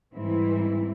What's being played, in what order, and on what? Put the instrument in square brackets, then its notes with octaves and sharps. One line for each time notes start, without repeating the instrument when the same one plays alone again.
[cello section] G#2 E3 G3 C4 E4